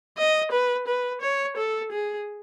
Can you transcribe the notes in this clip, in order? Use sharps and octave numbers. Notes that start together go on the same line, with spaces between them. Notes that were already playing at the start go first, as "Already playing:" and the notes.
D#5
B4
B4
C#5
A4
G#4